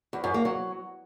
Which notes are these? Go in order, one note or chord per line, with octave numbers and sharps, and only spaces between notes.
E2
F#2
A#3
F#3